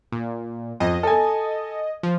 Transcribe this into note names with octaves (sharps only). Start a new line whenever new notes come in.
A#2
F2 D#5
A4 G#5
F3